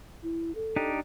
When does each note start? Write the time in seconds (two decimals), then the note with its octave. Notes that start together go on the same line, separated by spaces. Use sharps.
0.23 E4
0.55 A4
0.76 D4 D#4 G4